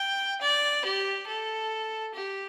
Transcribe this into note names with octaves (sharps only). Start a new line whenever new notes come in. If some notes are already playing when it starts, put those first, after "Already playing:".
Already playing: G5
D5
G4
A4
G4